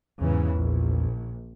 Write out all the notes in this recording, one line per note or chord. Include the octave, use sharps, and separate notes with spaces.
E2 G#2 C#3 E3
A#1